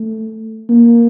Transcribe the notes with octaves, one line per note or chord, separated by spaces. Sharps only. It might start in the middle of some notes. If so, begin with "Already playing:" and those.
Already playing: A3
A#3